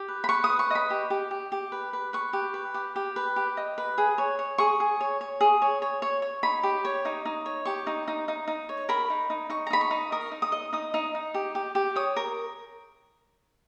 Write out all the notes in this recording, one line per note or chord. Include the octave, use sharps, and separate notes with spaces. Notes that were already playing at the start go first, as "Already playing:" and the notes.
Already playing: G4
B4
B5
B4 C#6
D#6
B4
C#6
D#5 B5
G4
G4
G4
G4
B4
B4
B4 C#6
G4
B4
G4
G4
B4
G4
D#5
B4
G#4
C#5
C#5
G#4 C#6
G#4
C#5
C#5
G#4
C#5
C#5
C#5
C#5
D#4 B5
G4
C#5
D#4
D#4
C#5
G4 C#6
D#4
D#4
D#4
D#4
C#5
A#4 B5
D#4
D#4
D#4 C#6
A#5
D#4 B5
C#6
D#4
A#4 D#6
D#4
D#6
D#5
D#4 D#6
D#4
D#4
G4
G4
G4
C#5 D#6
A#4